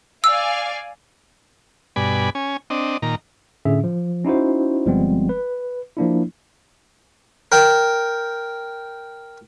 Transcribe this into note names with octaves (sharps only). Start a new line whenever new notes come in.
D5 F5 G#5 E6
G2 B2 D5 G#5 B5
C#4 G#5
C4 D4 D#5
A#2 D#3 A#5
A2 D3 C#4 G#4 E5
F3
C#4 D#4 E4 F#4 C5
G1 F3 G3 G#3 B3 C4
B4
F3 A#3 D4 E4
A#4 G5